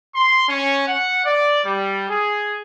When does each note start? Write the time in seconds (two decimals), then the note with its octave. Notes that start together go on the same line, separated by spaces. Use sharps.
0.15 C6
0.48 C#4
0.87 F#5
1.25 D5
1.64 G3
2.09 G#4